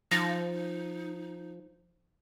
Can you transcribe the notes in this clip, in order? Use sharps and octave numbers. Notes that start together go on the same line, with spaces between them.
F3 D#4 A6 A#6